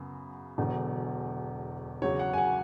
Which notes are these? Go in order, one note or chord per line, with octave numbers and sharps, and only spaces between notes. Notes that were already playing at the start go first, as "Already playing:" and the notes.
Already playing: F#2 C#3 B3
E1 E2 D3 F#3
E2 C#3 F#3 C#5
F#5
G#5
F#5